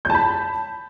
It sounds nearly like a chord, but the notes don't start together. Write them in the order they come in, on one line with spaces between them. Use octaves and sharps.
G6 A5 B5